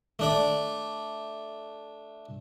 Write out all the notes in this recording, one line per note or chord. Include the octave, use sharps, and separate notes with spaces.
A3 D4 D5